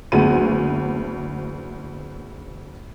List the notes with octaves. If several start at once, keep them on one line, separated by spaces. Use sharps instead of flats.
F#1 D2 G#3 B3 F#5 D#7